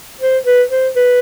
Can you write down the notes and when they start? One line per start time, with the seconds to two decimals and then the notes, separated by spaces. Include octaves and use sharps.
0.21 C5
0.46 B4
0.71 C5
0.96 B4